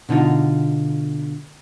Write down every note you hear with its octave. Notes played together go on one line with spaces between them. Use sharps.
B2 D3 D#4 F4